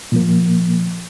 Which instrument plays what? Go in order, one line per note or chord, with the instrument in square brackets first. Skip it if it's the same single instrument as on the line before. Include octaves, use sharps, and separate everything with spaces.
[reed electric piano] A#2 F3 A#3